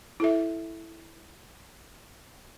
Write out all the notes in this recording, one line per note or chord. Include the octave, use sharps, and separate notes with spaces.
E4 A4 E5